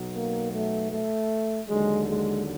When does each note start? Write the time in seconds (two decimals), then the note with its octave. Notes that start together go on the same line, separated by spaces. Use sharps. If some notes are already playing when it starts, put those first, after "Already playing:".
Already playing: B1 B2 F#3
0.15 A#3
0.53 A3
0.92 A3
1.68 D#2 D3 F#3 G#3
2.07 G#3